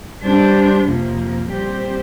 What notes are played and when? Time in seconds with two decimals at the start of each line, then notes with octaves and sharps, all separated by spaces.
0.23 G3 D4 G4 C5
0.86 F2 C3 F3 A#3
1.48 A#2 G3 C4 G4 C5